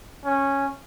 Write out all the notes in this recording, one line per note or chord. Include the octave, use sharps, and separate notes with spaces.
C#4